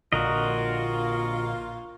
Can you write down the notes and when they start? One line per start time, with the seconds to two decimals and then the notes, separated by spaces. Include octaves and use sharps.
0.13 A#1 A#2 D3 A#3 F4 F#4 A#4 D#5